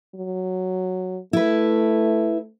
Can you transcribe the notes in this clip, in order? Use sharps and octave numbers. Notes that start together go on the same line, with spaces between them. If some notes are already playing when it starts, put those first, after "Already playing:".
F#3
A3 E4 B4